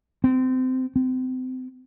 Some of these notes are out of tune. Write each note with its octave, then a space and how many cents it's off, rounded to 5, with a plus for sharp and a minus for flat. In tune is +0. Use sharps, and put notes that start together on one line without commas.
C4 -25
C4 -30